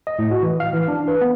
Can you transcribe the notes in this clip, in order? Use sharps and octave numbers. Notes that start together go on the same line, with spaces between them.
D#5
A2
F#4
E3
F5
E3
D4
B4
B3